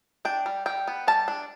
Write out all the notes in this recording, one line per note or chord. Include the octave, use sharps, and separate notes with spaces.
D4 G5
G3
G3 G5
B3
G3 A5
D4